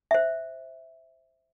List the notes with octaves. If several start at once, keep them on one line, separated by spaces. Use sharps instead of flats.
C5 E5